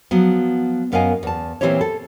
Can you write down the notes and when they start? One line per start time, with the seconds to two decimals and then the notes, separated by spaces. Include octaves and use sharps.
0.11 F3 F#3 B3
0.92 F#2 B3 A#4 D#5 F5 G#5
1.23 E2 A5
1.61 A#2 E3 C4 E4 G4 C#5
1.81 A4